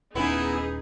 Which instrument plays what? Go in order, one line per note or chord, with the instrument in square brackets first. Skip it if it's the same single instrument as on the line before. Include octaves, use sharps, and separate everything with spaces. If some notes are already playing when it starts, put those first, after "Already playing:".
[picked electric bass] D#1 C#4 [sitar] B3 E4 [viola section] D#4 G#4